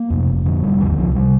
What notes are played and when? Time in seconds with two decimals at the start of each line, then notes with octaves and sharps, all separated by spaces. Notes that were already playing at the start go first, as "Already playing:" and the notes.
Already playing: A#3
0.10 F2 C3
0.28 F1
0.45 F2 D3
0.63 F1 G3
0.80 D#2 D3 F3
0.98 C2 F3
1.15 C3 G3